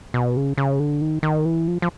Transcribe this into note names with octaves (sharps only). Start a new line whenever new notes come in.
B2
C#3
C#3
D3
D#3
D#3
E3
F3
F3